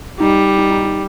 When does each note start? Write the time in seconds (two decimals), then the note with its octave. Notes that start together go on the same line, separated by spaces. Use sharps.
0.20 G3 D#4
0.58 D#4
0.71 D#4
0.84 D#4